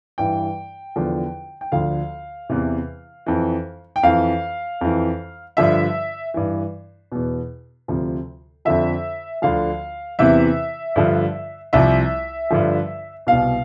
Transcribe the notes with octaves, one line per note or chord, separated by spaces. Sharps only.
G2 E3 G5
E2 D3 F3
G5
D2 D3 F3 F5
E2 C3 E3
F2 E3
G5
F2 E3 F5
F2 E3
G2 D3 F3 E5
G2 E3
E2 B2
D2 C3 F3
F2 D3 F3 E5
D2 D3 F3 F5
E2 C3 E3 E5
G2 D3 F3
C2 C3 F3 E5
G2 D3 F3
C2 B2 F5